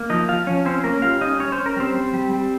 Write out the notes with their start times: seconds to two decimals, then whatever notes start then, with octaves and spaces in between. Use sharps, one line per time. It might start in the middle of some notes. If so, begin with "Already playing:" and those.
Already playing: A#3
0.10 F3 D#4 D#5
0.28 F3 F4 F5
0.46 F3 C#4 C#5
0.65 C4 C#4 C5
0.84 A#3 C#4 A#4
1.02 G3 F4 F5
1.21 C#4 D#4 D#5
1.40 C#4 C#5
1.52 C5
1.58 C#4
1.66 A#4
1.76 G3 C4 C5
1.95 G3
2.14 G3
2.31 G3